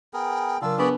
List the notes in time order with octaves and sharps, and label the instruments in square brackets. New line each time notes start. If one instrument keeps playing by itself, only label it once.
[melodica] B3 G#4 A#4 [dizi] G5
[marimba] C#3 F#3 A#4 [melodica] D4 F4 [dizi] E6
[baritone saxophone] B3 [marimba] D4 [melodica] G#4 D5 B5 [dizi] C#6